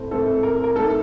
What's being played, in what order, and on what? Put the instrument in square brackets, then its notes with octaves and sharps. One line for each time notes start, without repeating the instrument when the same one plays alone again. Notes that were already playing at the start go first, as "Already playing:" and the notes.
Already playing: [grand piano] A2 A3 C4
[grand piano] A2 A3 C4 [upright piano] A4
[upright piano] A#4
A#4
[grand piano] A3 D#4 A#4 [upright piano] A4